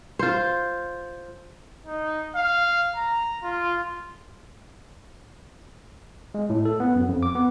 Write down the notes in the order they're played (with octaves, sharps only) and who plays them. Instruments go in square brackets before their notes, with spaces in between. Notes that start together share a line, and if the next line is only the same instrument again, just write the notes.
[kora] F4 C5
[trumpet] D#4
F5
A#5
F4
[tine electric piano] G#3
A2
A4
B3
F#2
F2
D6
B3